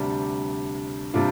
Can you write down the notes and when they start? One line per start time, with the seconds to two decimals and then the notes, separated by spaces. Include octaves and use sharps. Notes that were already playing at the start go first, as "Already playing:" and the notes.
Already playing: D2 C3 G3 D4
1.14 C3 G3 D4 F4